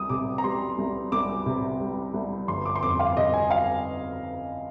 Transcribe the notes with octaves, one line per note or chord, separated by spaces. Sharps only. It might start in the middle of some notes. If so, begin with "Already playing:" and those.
Already playing: C2 D#6
C3 D6
A#5
G3 C6
C2
C2 D6
C3
G3
C2
G1 C6
D6
C6
F2 D6
F5
C3 D#5
G#5
F5